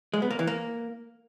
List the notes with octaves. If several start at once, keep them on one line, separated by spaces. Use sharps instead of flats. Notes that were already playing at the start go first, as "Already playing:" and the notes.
G#3
B3
A#3
E3
A#3